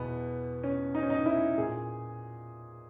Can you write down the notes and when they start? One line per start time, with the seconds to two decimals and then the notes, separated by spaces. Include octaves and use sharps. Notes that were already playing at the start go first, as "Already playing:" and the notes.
Already playing: E2 B2 B3
0.64 C#4
0.95 D#4
1.03 C#4
1.10 D#4
1.26 E4
1.58 A#2 G#4